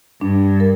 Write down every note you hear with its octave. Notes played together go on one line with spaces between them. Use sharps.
G2 D4
A#4